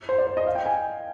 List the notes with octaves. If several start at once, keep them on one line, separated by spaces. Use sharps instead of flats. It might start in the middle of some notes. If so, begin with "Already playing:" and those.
C5
D5
C5
D#5
F5
G5
G#5